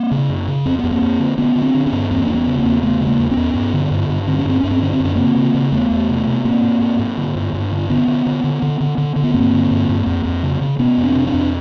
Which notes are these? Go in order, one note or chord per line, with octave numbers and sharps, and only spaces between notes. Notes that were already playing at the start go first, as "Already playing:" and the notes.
Already playing: A#3 C4
C#3
F#2
C#3
F2 C4
F2 B3
A#3 C4
F2
D3
D3 B3 C#4
D3
C4 D4
D3
B3 C#4
G2
E2 A#3 C4
E2 D4
B3 C#4
C#3
A#3 C4
E2
C#3 A3 B3
C#3
G#3 A#3
E2
B3 C#4
E2
G2
D3
G2
G2
D3 C4
C#4
G2 C4
G2 C#4
C4
D3 C#4
C4
F#2 C#4
C#3 A#3 C4
C#3
C#3
E2 A3 B3
E2
C3
C3
B3
G#2 A#3 C4
G#2
G#2
G#2
D3
G2
G2
D3
D3 B3 C#4
D3
D3
D3
D3
D3
D3
D3
B3
G2 A#3 C4
D3
G2
G2
F2
F2
C#3
C#3
C3 B3 C#4
F2
C4 D4
C3
C4 D4
F2